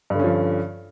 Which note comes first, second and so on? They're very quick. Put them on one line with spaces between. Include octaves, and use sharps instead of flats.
G2 D3 C#4 F3